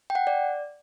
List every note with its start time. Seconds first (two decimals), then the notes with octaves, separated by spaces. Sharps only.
0.10 G5
0.15 F#5
0.27 D5